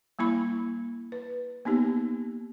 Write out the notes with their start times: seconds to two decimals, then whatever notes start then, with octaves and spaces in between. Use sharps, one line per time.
0.19 G3 A#3 E4 B5
1.12 B4
1.65 A#3 B3 D#4 G4